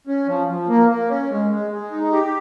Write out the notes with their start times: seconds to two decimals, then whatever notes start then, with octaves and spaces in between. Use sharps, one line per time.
0.07 C#4
0.27 F3
0.48 F3
0.68 A#3
0.89 A#3
1.09 C#4
1.30 G#3
1.51 G#3
1.71 G#3
1.91 D#4
2.11 G4